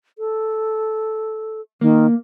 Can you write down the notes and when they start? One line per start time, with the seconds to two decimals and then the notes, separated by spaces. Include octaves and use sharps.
0.18 A4
1.81 D#3 A#3